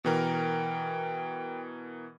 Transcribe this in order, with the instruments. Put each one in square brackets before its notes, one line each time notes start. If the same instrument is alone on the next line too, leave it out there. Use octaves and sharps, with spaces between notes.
[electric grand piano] B2 E3 A#4 [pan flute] G5